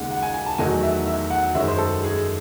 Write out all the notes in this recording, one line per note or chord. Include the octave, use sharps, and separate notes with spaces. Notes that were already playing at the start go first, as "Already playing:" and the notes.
Already playing: D#2 C#3 G#3 D#4 F#5
F#5
G#5
G#5
A5
E2 D#3 F#3 A3 D#4 G#5
E5
E5
F#5
F#2 D#3 G#3 C#4 E5
C5
A4
G#4